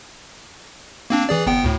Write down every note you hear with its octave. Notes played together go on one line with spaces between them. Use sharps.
A#3 C4 D4
E3 G#4 D5
G1 B3 G5
D2 A2